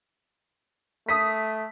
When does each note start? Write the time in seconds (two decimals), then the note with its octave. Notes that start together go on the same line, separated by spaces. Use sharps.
1.09 A3 D#6 B6